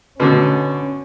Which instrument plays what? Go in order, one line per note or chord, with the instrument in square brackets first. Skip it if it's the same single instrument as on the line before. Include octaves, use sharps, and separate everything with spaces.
[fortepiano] B2 D3 [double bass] C#4